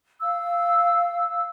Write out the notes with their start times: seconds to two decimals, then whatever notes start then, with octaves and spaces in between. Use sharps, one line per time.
0.21 F5 E6